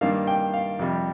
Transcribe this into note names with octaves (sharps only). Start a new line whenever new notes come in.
G2 D#3 A#3 D4 F5
G5
F5
F2 C3 G3